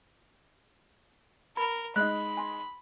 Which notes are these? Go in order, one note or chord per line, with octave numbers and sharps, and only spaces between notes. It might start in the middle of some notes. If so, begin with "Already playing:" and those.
A#4 B5
G#3 D#4 B5 F#6
G#5 C6